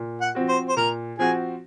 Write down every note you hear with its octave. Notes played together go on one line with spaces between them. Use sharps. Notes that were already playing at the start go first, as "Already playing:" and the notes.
Already playing: A#2
F#5
F3 C4 F#4
C5
C5
A#2 A#4
F3 C4 F#4 G#4